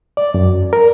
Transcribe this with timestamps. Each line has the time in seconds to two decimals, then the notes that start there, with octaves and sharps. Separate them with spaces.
0.17 D5
0.34 F#2
0.73 A#4